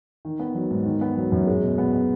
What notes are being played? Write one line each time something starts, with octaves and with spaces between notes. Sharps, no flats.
D#3
B3
F#3
G#2
D#3
B3
F#3
F#2
G#3
B2
B3
B2